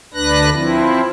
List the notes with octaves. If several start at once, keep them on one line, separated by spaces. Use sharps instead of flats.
D2 D4 B4 F#6 A#6
F3 C4 E4